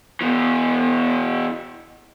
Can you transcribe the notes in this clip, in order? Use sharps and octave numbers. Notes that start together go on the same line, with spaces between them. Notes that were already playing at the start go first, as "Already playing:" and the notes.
B2 E3